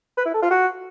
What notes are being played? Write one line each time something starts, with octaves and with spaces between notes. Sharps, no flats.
B4
E4
A4
F4
F#4